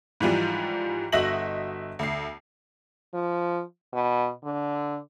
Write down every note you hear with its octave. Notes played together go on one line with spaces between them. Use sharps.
G#2 E3 F3 G3
G1 F#4 D#5 E5 A#6 F#7
D2 C7
F3
B2
D3